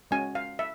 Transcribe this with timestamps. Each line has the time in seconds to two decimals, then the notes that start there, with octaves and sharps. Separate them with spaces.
0.11 G#3 C#4 F#4 G#5
0.35 F5
0.59 E5